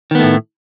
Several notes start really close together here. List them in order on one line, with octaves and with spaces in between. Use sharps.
D#3 B3 A3 A2